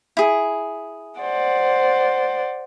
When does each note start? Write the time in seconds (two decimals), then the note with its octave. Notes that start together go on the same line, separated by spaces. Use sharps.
0.17 E4 G#4
1.20 C5 D5 F#5